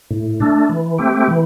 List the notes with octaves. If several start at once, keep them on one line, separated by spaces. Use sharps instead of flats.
A2
A3 D4
E3
A3 C4 G4
E3